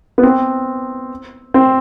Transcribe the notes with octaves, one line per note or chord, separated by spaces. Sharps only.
B3
C4
C4